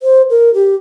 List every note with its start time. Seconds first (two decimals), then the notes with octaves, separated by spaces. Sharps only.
0.01 C5
0.30 A#4
0.54 G4